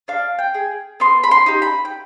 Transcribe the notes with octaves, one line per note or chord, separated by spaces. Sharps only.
D4 F5
G5
G#4
B3 C6
B5
C6
D#4 G4
B5
G5